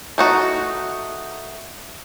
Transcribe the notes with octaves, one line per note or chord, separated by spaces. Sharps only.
A3 D#4 F#4